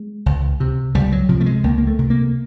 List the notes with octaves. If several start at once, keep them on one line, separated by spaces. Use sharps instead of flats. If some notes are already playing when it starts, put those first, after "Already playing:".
Already playing: G#3
C#2
C3
C#2 G3
F#3
C3 F3
A3
G#3
C#2 A#3
A#3
A3
C3
A#3